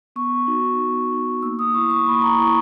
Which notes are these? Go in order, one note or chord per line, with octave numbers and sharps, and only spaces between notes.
B3 C#6
D#4 F#4
B3
D#4 F#4
A#3 E6
D#6
E4 C#6
C#6
A#3 B5
A#5
E4 C#6